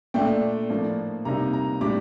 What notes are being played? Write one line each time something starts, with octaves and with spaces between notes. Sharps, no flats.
A#2 A3 D4 G5
A2 F3 A#3 D4
C3 G3 A#3 D#4 A#5
A#5
A2 G3 D4 D6